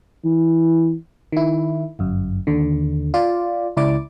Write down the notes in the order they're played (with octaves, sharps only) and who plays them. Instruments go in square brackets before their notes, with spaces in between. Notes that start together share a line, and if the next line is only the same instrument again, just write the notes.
[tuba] E3
[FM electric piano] D#3 E4
G1 F#2
D#2 D3
F4 D5
C#2 E4 D5 D6